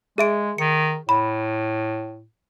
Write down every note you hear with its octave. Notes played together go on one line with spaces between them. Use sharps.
G#3 G#4 E5 D7
D#3 C#7
A2 B5